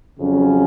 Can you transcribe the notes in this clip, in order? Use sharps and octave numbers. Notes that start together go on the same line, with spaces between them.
F2 C#3 F#3 C#4